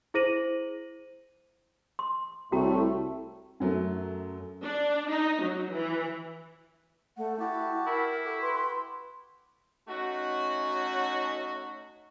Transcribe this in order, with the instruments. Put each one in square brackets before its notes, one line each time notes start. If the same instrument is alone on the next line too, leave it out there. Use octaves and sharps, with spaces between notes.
[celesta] E4 G#4 C5 A#6 D#7 F#7
[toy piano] C6
[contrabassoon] C2 [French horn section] A2 A3 [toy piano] F#4 G5 A#5
[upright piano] F#2 F#3 A3
[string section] D4
D#4
F#3
E3
[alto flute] A3 [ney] F#5
[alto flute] E4 [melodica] F#4 G4 A5 [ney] F#5
[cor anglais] E4 [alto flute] A#4
[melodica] F#4 G4 [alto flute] A4
[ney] B4 [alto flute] C6
[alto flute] C6
[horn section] A3 C#4 D#4 F#4